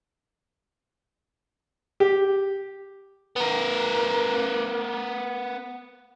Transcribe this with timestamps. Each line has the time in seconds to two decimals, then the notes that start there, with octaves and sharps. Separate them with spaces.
2.00 G4
3.36 B3 A#4